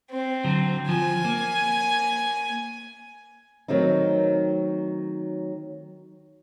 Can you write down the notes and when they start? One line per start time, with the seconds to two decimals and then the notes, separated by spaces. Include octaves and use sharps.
0.11 C4
0.44 D3 F#3
0.89 F3 G#5
1.25 A#3
3.68 D#3 F#3 A3 C4 D#4